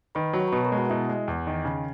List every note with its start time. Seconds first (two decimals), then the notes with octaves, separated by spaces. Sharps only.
0.15 D#3 B4 B5
0.33 F#3
0.40 C#5 C#6
0.48 A#5
0.52 B2 B4 B5
0.65 A#4 A#5
0.72 G#3
0.78 F#4 F#5
0.85 D#5
0.90 B2 E4 E5
1.09 G#3
1.28 E2
1.47 D#3
1.65 C#3